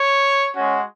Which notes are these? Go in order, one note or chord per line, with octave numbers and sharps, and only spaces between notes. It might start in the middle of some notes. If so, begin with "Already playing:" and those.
Already playing: C#5
G#3 C#4 F#4